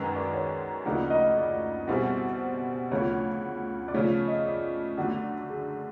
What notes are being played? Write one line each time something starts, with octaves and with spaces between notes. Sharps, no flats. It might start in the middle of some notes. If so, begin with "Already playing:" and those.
Already playing: F#2 D#3 G#3 C#4 B4
D5
C#5
D2 C#3 F3 A#3 D#4 D5
D#5
D5
B2 G3 C4 E4 G#4
D2 C#3 F3 A3 C#5
D5
C#3 F3 A3 C#5
D#5
D5
D3 F#3 A3
G#4